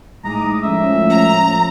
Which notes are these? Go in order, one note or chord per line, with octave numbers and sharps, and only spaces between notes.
A2 G#3 D#4 A#5 D6 D#6
F3 A3 C#4 E5
A#5